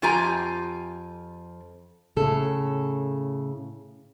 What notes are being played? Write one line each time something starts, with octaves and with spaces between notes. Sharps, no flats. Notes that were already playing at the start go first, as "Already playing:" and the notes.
F2 F4 G4 G#5 A#5
A2 C#3 A4